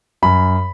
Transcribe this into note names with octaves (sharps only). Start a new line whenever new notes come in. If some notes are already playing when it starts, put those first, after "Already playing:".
F#2 B5